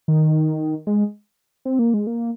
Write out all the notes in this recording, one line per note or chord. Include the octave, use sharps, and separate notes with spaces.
D#3
G#3
C4
A#3
G#3
A#3